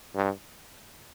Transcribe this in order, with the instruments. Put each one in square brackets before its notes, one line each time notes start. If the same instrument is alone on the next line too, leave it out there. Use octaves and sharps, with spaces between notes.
[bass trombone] G2